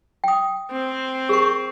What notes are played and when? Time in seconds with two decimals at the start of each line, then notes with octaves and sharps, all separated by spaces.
0.24 G5 D#6
0.71 C4
1.29 G#4 A#4 C#6